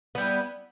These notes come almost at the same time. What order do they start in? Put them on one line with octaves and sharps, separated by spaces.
B3 G3 E4